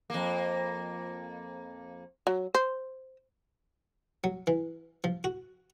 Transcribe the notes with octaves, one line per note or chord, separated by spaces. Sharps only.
F2 A#3
F#3
C5
F#3
E3
F3
F#4